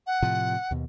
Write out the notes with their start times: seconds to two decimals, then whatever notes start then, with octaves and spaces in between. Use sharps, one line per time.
0.07 F#5
0.22 A2 C3 F3
0.71 D#2 B2